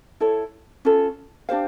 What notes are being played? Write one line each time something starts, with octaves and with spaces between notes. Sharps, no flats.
E4 A4 C#5
C#4 F4 A4
D4 G4 C5 F5